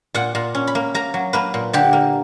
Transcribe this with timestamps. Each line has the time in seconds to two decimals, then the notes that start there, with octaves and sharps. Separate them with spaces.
0.14 A#2 F#5
0.35 A#2
0.55 C#4
0.67 B5
0.75 A#3
0.94 A#3 A#5
1.14 F#3
1.33 A#3 B4
1.54 A#2
1.73 D3 G4
1.93 A#3